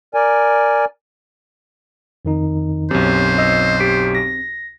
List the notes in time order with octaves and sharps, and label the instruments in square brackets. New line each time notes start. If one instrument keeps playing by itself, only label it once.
[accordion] A#4 D5 G#5
[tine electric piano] F2 D#3 D#4
[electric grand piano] B1 F#2 [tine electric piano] C4 [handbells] G4 [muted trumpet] C5
[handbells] D#5 E6 C7
G4 B6 D7
A#6